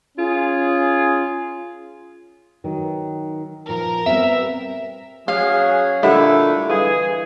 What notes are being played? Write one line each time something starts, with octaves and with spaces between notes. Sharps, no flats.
C#4 F4 G#4
D#3 F#3
A#2 F3 A#4
G3 B3 C4 E5
F#3 C#4 G#4 F5
A#2 D3 G3 A3 E4 G4 A4 F#5
E3 G3 G#4 F5